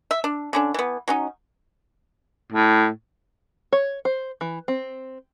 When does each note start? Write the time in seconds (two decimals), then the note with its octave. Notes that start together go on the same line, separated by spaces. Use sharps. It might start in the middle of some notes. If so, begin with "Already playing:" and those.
0.11 E5
0.24 D4
0.53 D3 C#4 D4
0.74 E3 B3
1.08 F#3 C#4 D#4
2.53 A2
3.73 C#5
4.05 C5
4.41 E3
4.68 C4